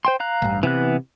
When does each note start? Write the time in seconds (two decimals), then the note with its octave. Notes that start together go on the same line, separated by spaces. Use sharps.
0.05 C5 G5 C6
0.20 F5 A#5 F#6
0.42 A1 G2
0.63 C3 E3 B3 F#6